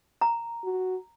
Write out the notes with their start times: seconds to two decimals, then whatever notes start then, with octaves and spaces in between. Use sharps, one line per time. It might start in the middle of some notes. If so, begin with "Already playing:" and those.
0.21 A#5
0.64 F#4